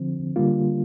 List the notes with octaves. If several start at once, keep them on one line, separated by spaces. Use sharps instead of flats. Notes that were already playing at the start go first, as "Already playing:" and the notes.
Already playing: D3 F3 C4
D3 G3 A#3 F4